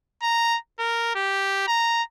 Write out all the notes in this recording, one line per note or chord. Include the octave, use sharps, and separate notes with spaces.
A#5
A#4
G4
A#5